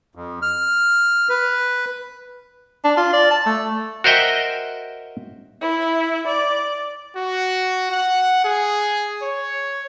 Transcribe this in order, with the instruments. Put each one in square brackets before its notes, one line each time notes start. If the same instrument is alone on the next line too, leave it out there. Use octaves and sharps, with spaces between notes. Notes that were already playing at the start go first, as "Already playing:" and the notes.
[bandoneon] F2
F6
B4
[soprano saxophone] D4
F4
D5
A5
A3
[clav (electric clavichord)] F#4 A#4 C5 D#5 E5 G5
[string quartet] E4
D5
[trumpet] F#4
F#5
G#4
C#5